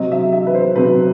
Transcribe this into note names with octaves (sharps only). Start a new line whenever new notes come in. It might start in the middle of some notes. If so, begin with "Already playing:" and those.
Already playing: C3 F#3 C4 D#5
E5
E5
B4
C5
C3 F#3 C4 B4